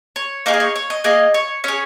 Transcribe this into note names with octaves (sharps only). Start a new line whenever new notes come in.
C#5
A#3 D#4 G#4 A#4
D#5
C#5
C#5
D#5
A#3 D#4 G#4 D#5
C#5
C#4 G#4 C#5